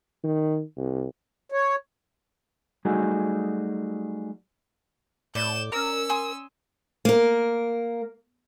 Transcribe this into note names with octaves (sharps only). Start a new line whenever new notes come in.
D#3
C2
C#5
F#3 G3 A3 D#4 F#4 G#4
A2 D5 G6 E7
C#4 A#4 E6
G#5 C6 D#6
A#3 A#4